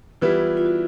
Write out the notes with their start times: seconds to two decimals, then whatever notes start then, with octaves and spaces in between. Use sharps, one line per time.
0.21 E3 G3 B3 E4 F4
0.57 F4
0.66 F#4